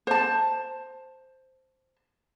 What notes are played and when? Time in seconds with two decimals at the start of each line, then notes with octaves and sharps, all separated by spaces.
0.07 C5 A5